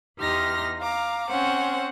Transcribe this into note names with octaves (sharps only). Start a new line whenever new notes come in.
E2 D#4 G4 C6 F6 A#6
F5 A#5 D6
C4 C#4 C5 F#5